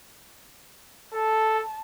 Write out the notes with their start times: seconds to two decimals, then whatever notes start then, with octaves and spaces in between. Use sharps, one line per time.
1.14 A4 A5